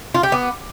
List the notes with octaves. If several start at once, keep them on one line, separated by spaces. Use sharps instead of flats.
F4
G4
B3